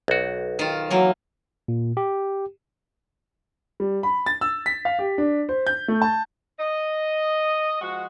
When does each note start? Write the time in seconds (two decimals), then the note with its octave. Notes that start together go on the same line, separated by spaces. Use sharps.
0.08 B1 F#4
0.59 D#3 F4
0.91 E3 F#3 A#3
1.68 A#2
1.97 G4
3.80 G3
4.03 B5
4.26 A6
4.41 E6
4.66 B6
4.85 F5
4.99 G4
5.18 D4
5.49 C5
5.67 G6
5.88 A3
6.02 A5
6.59 D#5
7.81 F3 G#3 F#4